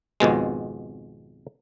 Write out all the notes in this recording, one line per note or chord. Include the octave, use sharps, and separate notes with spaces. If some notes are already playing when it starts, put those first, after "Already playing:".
G#1 F2 B2 G#3